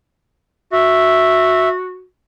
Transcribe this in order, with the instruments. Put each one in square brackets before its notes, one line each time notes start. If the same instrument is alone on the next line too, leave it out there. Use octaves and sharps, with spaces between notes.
[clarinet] F#4 [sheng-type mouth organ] E5